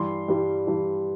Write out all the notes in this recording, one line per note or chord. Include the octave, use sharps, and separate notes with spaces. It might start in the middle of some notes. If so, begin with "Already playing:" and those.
Already playing: G2 E3 G3 C6
G2 E3 G3
G2 E3 G3